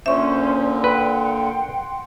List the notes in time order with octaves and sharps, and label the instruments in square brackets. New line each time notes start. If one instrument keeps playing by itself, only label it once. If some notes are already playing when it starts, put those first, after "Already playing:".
[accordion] A#2 D3 [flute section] C#4 C5 C#5 [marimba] E5 C#6
[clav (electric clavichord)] B4 [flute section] F#5 G5 C6